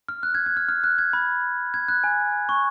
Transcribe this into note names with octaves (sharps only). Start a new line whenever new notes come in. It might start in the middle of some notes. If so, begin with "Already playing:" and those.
F6
F#6
G#6
F#6
F6
F6
F#6
G#6
B5
G#6
F#6
G#5
C#6